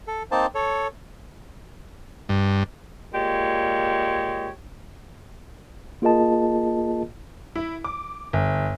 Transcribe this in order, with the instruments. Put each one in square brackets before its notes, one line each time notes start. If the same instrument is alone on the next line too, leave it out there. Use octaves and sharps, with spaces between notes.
[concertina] A4
A#3 C4 D#4 C5 A5
A4 C#5
[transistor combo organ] G2
[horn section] A#2 G#3 G4 C#5
[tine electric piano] A#3 F4 G#4 A#4 D#5 A5
[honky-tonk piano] E4
D6
G1